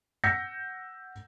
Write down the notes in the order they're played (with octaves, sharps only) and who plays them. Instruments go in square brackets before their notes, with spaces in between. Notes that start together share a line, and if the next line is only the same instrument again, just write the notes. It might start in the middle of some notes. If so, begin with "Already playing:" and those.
[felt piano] F#5 E6 G6 A#6 B6 C#7